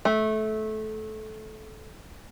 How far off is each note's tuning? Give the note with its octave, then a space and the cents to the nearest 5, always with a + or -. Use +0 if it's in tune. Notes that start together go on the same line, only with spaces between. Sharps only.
A3 -20